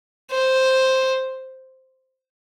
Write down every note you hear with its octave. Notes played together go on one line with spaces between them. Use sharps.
C5